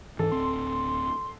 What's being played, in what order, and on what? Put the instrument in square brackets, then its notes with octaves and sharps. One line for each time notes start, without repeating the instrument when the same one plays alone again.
[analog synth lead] G#2 [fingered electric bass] E3 [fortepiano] A4
[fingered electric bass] D1 C4 [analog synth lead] C6